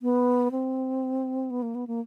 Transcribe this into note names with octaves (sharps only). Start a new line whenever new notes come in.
B3
C4
B3
A#3
B3
A#3